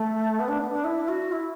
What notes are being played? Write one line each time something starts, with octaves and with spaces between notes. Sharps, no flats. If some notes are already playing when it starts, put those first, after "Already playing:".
Already playing: A3
B3
D4
B3
D4
E4
F#4
E4